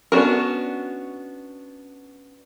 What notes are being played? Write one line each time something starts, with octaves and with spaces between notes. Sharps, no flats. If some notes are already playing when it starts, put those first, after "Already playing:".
B3 C#4 D4 F#4 A#4